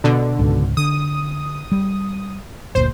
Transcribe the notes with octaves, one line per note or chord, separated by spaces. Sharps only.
B2 D3
C#2 G#2
D3 D#6
G3
F#1 D2 A#2 C5